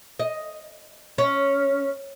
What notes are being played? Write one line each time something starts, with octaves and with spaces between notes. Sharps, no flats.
D#5
C#4